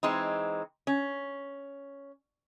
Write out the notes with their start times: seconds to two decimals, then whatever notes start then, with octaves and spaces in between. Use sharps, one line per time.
0.03 E3 G#3 C4 D#4
0.87 C#4